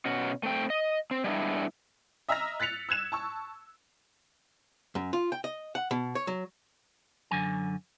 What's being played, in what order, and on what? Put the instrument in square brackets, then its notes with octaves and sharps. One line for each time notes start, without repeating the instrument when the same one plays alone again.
[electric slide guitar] B2 C#4 F#4
A3 C4 G5
D#5
C4
G3 G#3 B3 D4 E4
[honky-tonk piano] D#5 E5 A#5 E6 F6 A#6
F#6 A6 B6 C#7 F7
E6 F#6 G#6 E7
A5 C#6 E6
[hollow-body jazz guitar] F#2
F4
G5
D#5
F#5
B2
C#5
F#3
[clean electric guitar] F#2 D3 F#3 G#5